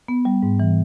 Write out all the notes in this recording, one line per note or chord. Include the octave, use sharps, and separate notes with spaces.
B3
G3
G#2
E3